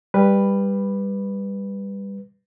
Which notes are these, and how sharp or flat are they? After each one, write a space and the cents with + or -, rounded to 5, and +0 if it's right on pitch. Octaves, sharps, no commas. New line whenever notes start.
G3 +15 B4 +0